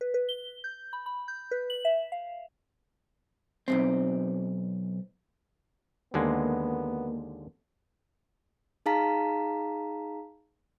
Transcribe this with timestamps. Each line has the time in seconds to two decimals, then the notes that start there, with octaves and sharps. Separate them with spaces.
0.01 B4
0.14 B4
0.29 G7
0.64 G6
0.93 B5
1.06 B5
1.28 G6
1.51 B4
1.70 F#7
1.85 E5
2.12 F5
3.68 B1 F2 C4
6.14 D#2 D3 G#3 A#3 B3 A#4
8.86 D#4 G#4 F5 A5 A#5 B6